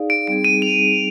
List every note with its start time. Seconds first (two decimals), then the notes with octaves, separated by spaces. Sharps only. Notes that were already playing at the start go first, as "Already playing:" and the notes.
Already playing: D#4 G#4 D5 F5
0.10 D7
0.27 G3 C4 D#4 G#4 D7
0.44 D#7
0.62 F7